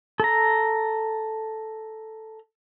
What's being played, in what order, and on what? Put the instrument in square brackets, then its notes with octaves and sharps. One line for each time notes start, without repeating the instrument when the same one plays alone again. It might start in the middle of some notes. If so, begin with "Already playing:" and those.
[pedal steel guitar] A4 A#5